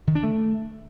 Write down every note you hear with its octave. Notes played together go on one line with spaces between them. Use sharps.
D#3
D4
A3